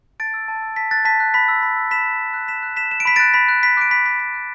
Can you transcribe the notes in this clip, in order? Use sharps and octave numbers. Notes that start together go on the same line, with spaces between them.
A5 A6 D7
E6
A5
E6
A5 B6
F#6 A6
A5 B6
F#6
B5 B6
E6
B5
E6
B5 B6 E7
F#6
B5
F#6
A5 B6 E7
F#6
A5 B6 E7
F#6 E7
D7
B5 B6
A6 D7
F#6
B5 B6
F#6
B5 B6
D6 F#6 D7
B5 B6
D6 F#6 B6
B5 B6
F#6